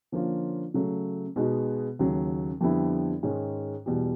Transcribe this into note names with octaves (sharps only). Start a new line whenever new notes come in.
D3 F3 A#3 C#4 F4
C#3 F#3 A3
B2 G#3 B3 D#4 F#4
D#2 C#3 F#3
F2 D3 G3 B3 E4
G#2 D#3 G#3 C#4
E2 B2 G3